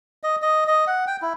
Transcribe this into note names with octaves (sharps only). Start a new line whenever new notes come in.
D#5
D#5
D#5
F#5
G5
E4